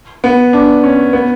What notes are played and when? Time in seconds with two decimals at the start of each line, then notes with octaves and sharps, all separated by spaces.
0.24 B3
0.53 D4
0.83 C#4
1.13 B3